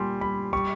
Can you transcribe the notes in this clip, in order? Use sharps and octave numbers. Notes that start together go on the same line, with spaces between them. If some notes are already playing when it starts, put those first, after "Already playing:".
Already playing: A#2 G3 G#5 C6
G3 B5
G3 C#6